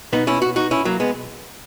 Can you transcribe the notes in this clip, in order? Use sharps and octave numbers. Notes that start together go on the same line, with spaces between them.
B2 B3 D#4
C#4 E4
F#4
D#4 F#4
C#4 E4
F#3 A#3
G#3 B3